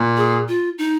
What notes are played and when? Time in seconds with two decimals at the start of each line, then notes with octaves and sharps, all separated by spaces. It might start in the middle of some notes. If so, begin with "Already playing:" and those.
Already playing: A#2
0.17 G#4
0.48 F4
0.78 D#4